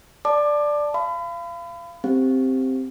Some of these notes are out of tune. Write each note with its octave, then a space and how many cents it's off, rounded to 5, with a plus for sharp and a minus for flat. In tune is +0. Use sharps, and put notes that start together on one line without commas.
D5 +0 A5 +0 D6 +25
F5 -30 B5 +35
C4 +0 G4 +0 F5 +0